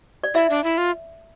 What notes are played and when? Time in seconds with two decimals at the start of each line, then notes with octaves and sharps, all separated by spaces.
0.24 D5
0.34 E4 E5
0.50 D4
0.64 E4
0.78 F4